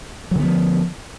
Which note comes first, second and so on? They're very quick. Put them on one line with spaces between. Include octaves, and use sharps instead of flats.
F#3 D3 B3 F3